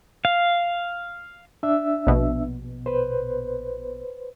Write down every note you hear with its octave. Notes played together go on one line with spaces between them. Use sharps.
F5
D4 E5 E6
A#1 B2
B4 C5